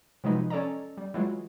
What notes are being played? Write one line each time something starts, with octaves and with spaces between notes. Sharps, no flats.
C3 F3 F#3 G#3 D#4 B4
C#4 A4 D5 D#5 A#5
G3
E3 F#3 G#3 F4